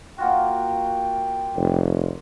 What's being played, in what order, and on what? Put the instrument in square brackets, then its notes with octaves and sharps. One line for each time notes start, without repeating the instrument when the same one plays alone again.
[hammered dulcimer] A#3 F4 F#4 [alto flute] G5
[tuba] F1